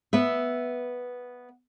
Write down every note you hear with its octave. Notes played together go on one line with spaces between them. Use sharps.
B3 B4 E5